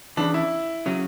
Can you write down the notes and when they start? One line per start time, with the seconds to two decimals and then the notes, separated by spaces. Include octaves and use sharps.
0.17 E2 C#3 E3 D4
0.34 E4
0.86 C#3 F#3 C#4 F#4